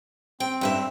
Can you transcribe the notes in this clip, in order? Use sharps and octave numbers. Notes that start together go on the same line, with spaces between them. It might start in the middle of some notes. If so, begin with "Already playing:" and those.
C4 G5
G2 B4 E5